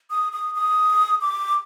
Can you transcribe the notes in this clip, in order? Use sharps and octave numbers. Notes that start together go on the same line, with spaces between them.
D#6
D#6
D#6
D6